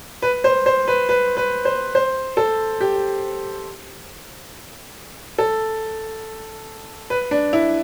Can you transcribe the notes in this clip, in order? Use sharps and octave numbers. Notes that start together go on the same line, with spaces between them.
B4
C5
C5
B4
B4
B4
C5
C5
A4
G4
A4
B4
D4
E4